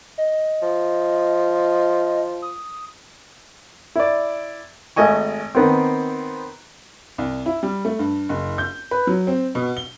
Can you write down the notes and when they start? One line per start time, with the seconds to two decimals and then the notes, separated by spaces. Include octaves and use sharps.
0.18 D#5
0.62 F3
2.42 D#6
3.96 E4 D5
4.96 G#1 A3 D#5 G#5 C#6
5.55 D#3 B3 C4
7.18 C2
7.46 E4
7.63 G3
7.85 A3
7.99 G2
8.29 F#1
8.58 G6
8.91 B4
9.07 F#3
9.27 C4
9.55 B2
9.77 G7